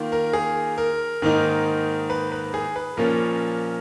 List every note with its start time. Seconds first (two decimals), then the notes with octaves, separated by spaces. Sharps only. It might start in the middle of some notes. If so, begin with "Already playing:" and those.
Already playing: D#3 A#3 F4
0.12 A#4
0.33 G#4
0.78 A#4
1.22 G#2 D#3 A#3 D#4
2.10 B4
2.32 B4
2.54 G#4
2.76 B4
2.97 A#2 F3 A#3 C#4 A#4